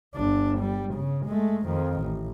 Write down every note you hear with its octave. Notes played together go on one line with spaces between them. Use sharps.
G1 D4
G3
C#3
G#3 A3
F2 D#3
A1